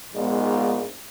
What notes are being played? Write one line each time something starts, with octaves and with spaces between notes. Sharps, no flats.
A#1 G#2 G#3 B3